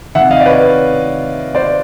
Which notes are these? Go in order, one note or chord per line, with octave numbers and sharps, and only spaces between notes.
D#3 E5 F#5
C3
D#5 F5
D5
B4 C#5
C5 D5